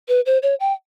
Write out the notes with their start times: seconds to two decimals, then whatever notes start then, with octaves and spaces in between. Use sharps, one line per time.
0.08 B4
0.26 C5
0.43 C#5
0.60 G5